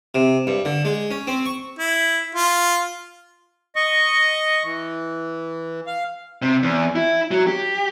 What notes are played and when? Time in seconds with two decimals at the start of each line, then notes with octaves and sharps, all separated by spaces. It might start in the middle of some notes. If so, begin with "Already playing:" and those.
0.15 C3
0.47 G2
0.65 D3
0.85 G#3
1.11 C#4
1.27 C4
1.46 C#6
1.79 E4
2.35 F4
3.76 D#5 C#6
4.64 E3
5.87 F5
6.42 C3
6.63 E2
6.96 E4
7.31 F#3
7.47 G4